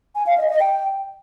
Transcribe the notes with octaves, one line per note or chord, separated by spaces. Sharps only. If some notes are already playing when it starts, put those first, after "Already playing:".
G#5
F5
D#5
D#5
G5